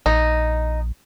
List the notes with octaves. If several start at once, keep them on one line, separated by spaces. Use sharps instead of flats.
A#1 D#4